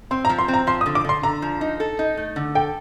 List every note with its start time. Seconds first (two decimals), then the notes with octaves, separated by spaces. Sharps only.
0.11 C4 C6
0.25 A#5
0.29 F3
0.39 C6
0.48 C4
0.54 A#5
0.67 F3 C6
0.81 D#6
0.86 D3
0.95 D6
1.05 D3 C6
1.23 D3 A#5
1.42 F3
1.61 D#4
1.80 A4
1.99 D#4
2.17 A3
2.36 D3
2.55 A4 G5